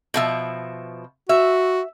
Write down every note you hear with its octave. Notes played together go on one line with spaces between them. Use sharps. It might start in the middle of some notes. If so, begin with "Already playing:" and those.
B2 F3 E5
F#4 E5